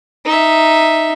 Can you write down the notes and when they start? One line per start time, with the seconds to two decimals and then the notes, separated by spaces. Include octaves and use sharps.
0.25 D#4 E5